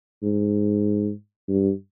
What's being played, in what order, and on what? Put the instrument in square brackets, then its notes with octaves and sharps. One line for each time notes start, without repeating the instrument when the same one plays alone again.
[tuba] G#2
G2